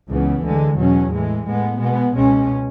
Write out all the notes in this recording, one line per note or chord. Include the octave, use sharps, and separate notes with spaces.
C#2 C#3 E3 B3
D2 D3 G#3
E2 B2 F#3 C#4
A2 E3 G#3
A2 G#3 B3
B2 G#3 B3
C#2 B2 G#3 C#4